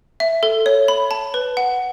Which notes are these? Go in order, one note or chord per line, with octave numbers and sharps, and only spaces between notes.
E5
A4
C#5
B5
A5
B4
F#5